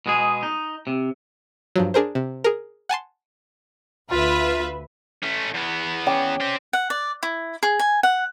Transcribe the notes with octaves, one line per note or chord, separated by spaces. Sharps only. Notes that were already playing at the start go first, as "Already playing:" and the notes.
B2 G#3 G#4
D#4
C3
G2 F3 F#3
D4 G#4 A#4 C5
C3
G#4 A#4
F#5 G#5 A5 C6
D2 F4 B4 E5
A3 C#4
E2 B3
C#4 G5 D6
C4 G4
F#5
D5
E4
G#4
G#5
F#5